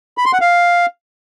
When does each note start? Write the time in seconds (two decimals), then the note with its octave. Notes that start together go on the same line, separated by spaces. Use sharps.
0.18 B5
0.25 C6
0.33 F#5
0.41 F5